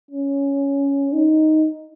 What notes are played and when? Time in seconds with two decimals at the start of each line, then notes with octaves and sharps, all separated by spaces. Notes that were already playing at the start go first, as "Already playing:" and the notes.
0.11 C#4
1.13 D#4